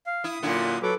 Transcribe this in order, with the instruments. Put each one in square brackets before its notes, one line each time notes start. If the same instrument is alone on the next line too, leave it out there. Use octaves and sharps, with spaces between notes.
[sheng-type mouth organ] F5
[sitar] E4 [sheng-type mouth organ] D#6
[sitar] F#2 D3 E4 [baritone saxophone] A#2
[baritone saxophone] F#3 [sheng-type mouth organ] A4 B4 D6